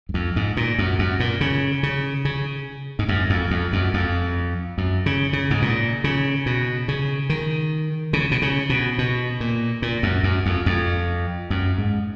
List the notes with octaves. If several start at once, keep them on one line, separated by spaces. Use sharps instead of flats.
F#2
F2
G#2
A#2
F#2
F#2
A#2
C#3
C#3
C#3
G#2
F#2
F2
F2
F#2
F2
F#2
C#3
C#3
G#2
A#2
C#3
B2
C#3
D#3
C#3
B2
C#3
B2
B2
A#2
A#2
F#2
F#2
F2
F2
F#2
G#2